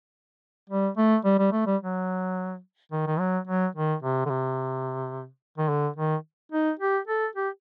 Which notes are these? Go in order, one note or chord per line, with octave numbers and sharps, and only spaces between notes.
G3
A3
G3
G3
A3
G3
F#3
D#3
D#3
F#3
F#3
D#3
C3
D3
C3
D#3
D3
D#3
D#4
G4
A4
G4